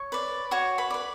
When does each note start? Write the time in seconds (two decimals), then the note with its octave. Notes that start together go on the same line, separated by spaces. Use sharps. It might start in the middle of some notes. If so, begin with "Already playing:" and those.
Already playing: C#5 C#6
0.12 B4 D5
0.51 F#4 C#5 C#6
0.78 B4 B5
0.90 B4 D5